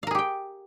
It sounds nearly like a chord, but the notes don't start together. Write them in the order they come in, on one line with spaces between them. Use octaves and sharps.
F5 A#4 G#4 G4 G5